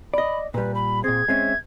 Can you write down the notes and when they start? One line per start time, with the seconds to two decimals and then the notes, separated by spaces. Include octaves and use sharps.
0.14 D5 D#5 B5
0.54 A#2 G3 B4
0.75 B5
1.04 A#2 C4 G#4 G#6
1.28 G#3 C4 C#4 E5